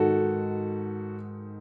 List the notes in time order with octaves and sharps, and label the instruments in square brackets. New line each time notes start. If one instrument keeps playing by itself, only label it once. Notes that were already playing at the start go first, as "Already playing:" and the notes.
Already playing: [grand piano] G#2 D#3 F#4 A4